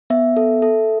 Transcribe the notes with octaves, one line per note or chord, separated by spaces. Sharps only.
B3 E5
A4
A4